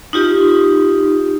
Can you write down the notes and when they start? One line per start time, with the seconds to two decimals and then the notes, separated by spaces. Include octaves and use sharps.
0.13 D#4 F4 G4